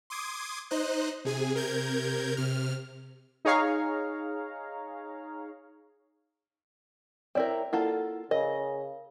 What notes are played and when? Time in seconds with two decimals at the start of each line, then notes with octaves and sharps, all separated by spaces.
0.10 C6 D6 D#6 G#6
0.71 D#4 C5 D#5 F#6
1.25 C3 G#4 G#5
1.55 C3 A#4 G6 G#6
2.37 C3 F6
3.45 D#4 G#4 C#5 F5 A#5
7.35 C4 E4 A#4 C#5 D5 G5
7.73 A#3 E4 F4 A4 F#5
8.31 C#3 A#4 D#5